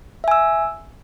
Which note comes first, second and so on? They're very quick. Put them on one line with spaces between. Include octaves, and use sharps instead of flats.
E5 G#5 E6